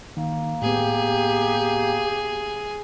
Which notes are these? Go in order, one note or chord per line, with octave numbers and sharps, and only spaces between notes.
D#3 A#3
A2 B3 G4 G#4